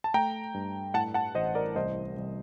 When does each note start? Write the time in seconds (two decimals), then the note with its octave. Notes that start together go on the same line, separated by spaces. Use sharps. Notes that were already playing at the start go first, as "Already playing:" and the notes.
0.04 A5
0.14 A3 G5 A#5
0.54 G2
0.94 A2 F#5 A5
1.14 F#5 A5
1.35 A1 C5 D#5
1.55 A#4 D5
1.76 C2 C5 D#5
2.17 C2